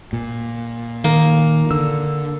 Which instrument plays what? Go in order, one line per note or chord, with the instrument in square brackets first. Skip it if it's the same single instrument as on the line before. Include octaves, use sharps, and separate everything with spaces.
[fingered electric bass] A#2
[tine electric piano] D#3 [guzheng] A#3
[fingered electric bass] D3 [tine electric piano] E6